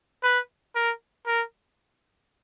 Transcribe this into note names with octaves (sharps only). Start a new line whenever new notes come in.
B4
A#4
A#4